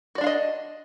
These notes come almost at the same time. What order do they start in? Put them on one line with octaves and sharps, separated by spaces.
F#4 D5 D4 F5 D#5